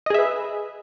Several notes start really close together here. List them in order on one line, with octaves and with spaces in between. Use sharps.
D#5 G#4 E5 B4